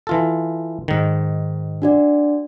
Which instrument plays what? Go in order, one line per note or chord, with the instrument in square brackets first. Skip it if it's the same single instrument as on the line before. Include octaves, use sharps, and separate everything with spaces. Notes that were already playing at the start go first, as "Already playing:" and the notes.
[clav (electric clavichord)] E3 F4 A4
G#2 D#3
[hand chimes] D4 F#4 D5